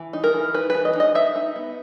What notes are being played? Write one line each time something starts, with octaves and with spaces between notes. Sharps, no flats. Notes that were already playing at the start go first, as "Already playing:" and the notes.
Already playing: E3
D#4
A#4
E3
D#4 B4
E3 B4
D#5
D#4 D#5
D#4 E5
D#4
B3